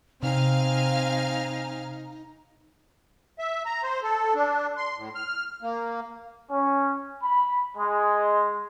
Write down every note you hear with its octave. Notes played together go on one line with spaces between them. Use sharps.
C3 C4 D#4 F5 G#5 F6
E5
A#5
C5
A4
D4
C6
A2
F6
A#3
C#4
B5
G#3